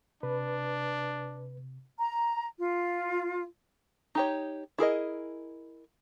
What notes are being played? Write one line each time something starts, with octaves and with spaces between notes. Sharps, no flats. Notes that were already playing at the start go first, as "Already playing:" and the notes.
C3 D4 B4
A#5
F4
D#4 G4 C#5
E4 G#4 A#4 D#5